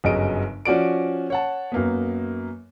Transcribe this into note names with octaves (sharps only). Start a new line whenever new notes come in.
G1 F#2 C#3 D#5 D7
F3 C#4 F#4 D5 D7
C#5 F#5 A5
F#2 A#3 B3